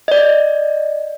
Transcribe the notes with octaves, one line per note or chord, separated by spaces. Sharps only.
D5 D#5